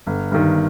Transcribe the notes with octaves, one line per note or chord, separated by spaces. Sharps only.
G1
G2 D#3